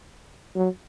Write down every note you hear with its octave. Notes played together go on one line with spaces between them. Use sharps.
F#3